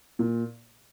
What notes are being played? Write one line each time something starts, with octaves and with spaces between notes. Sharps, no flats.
A#2